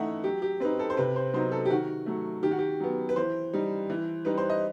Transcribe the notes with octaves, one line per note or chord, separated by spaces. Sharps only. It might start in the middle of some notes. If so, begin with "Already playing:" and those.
Already playing: E3 A3 D#4 E5 F#5
F#3 G4
G4
C4 D#4 B4
A4
C5
C3 B4
C5
F#3 B3 D#4 C5
A4
G4
D#3 F#4
F#3 A3
D#3 G4
F#4
G4
F#3 B3
B4
E3 C5
G3 D#4
E3
G3 D#4 B4
C5
D#5